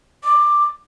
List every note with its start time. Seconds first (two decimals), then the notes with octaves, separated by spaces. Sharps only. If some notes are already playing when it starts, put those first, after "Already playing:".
0.24 D6